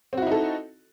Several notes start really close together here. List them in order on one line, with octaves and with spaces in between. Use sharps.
C4 F#4 E4 D#4 A4